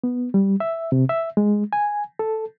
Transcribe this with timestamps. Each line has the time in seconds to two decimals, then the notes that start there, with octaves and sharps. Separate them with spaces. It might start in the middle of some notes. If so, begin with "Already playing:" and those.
0.04 B3
0.34 G3
0.60 E5
0.92 C3
1.09 E5
1.37 G#3
1.73 G#5
2.19 A4